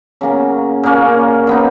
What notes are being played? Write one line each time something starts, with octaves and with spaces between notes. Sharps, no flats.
C#3 F#3 A#3 C#4
A#2 A#3 C#4
F#3 B3 D#4